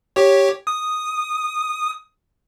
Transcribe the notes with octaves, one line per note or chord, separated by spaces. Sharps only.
G4 C#5
D#6